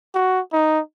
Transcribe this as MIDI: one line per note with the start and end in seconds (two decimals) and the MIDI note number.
0.15 0.40 66
0.53 0.80 63